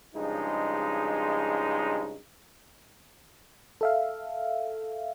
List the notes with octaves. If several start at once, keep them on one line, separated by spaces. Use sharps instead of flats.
G2 C#3 F3 G#3 D#4
A4 E5 F5